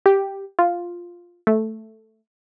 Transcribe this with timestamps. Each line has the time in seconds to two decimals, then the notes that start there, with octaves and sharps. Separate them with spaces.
0.06 G4
0.59 F4
1.47 A3